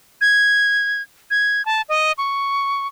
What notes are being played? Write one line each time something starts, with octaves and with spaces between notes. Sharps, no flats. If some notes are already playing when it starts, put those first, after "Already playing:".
G#6
G#6
A5
D#5
C#6